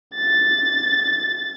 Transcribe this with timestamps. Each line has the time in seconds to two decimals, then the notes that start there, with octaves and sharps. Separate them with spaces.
0.15 A6